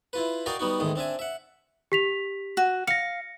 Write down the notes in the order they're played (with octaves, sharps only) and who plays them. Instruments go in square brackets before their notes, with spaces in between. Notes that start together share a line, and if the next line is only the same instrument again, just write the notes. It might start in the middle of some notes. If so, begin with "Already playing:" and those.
[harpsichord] E4 F4 B4
F#4 A#4 D5 D#5 F5 G5
G3 B3 D#4 F#4
E2 A2 D#3 G#3
C4 D4 E5 G#5
E5 F#5
[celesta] G4 B6 F7
[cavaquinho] F#4
[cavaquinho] F5 [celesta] A#6 C#7